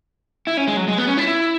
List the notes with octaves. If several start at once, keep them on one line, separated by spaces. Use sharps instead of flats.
E4
C#4
G#3
F#3
G#3
B3
C#4
E4
E4